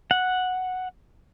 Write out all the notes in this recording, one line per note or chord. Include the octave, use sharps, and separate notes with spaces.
F#5